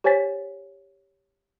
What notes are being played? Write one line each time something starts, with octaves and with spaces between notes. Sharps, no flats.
G4 C5 C#5 G#5 A6 B6